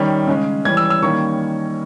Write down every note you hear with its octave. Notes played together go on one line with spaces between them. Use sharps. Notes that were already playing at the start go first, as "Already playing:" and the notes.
Already playing: D#3 G3 C#4
C#3 G#3 C#4
E3 G3 C#4 G#6
E6
E6
D#3 G3 A#3 C#4 C#6